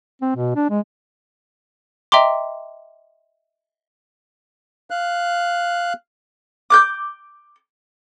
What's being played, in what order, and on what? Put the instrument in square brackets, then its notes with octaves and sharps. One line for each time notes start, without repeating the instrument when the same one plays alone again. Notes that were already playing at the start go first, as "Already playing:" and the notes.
[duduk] C4
B2
D4
G#3
[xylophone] D#5 E5 G5 A#5 C6 D6
[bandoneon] F5 F#6
[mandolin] D6 F#6 G6